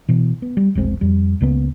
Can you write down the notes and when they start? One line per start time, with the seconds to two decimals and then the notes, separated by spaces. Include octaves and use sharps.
0.09 B2 E3
0.42 B3
0.57 G3
0.75 E1 A#1 G#3 C4
1.01 F2 G3
1.41 C#2 C#3 A#3 B3